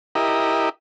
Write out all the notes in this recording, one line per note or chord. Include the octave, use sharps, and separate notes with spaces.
E4 G4 A#4 D#5